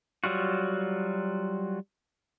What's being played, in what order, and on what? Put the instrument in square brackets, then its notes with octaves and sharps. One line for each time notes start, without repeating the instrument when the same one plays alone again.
[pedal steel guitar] F#3 G3 F4 F#4